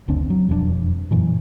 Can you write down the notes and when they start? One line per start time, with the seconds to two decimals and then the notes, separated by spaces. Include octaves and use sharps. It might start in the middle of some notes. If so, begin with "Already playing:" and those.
0.08 F#1 D2 C4 D4
0.30 F#3
0.49 E1 F2 G3 D4
1.11 F#2 A#2 E3 F#3